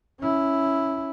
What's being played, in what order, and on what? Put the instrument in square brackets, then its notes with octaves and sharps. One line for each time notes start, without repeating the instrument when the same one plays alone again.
[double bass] C#4 E4